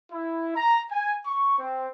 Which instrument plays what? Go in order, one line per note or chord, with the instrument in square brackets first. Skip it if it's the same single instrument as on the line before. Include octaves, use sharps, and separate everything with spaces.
[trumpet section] E4
A#5
G#5
C#6
C4